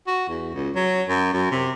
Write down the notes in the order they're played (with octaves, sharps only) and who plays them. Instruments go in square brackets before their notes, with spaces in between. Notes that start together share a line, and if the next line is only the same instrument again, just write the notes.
[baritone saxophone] F#4
E2
C#2
F#3
F#2
F#2
C3